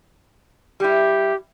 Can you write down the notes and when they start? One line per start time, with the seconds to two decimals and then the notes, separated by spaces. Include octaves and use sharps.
0.80 G3 E4 G4